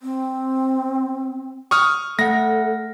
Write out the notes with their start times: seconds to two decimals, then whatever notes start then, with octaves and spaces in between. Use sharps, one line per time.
0.02 C4
1.71 C#6 D#6 F6
2.19 A3 A4 F#5 A#6